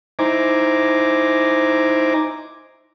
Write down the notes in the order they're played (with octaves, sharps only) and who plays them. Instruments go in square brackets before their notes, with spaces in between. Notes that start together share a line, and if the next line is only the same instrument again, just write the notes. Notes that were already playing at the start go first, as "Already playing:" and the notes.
[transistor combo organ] D#4 E4 C5 G#5 A#5 D6